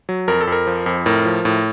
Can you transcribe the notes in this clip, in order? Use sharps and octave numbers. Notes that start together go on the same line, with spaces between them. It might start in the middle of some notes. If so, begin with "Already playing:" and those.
F#3
F2 A#4
A4
F2 A#4
F3
F2
A2 A#4
F3
A2